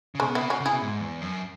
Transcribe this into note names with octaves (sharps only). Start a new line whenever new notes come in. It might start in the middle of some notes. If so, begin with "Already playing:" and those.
C#3
B2 G#3 C#4
B3 E4
C#3
C#4 F#4
C#3
E4 G#4
B2
G#2
E2
F#2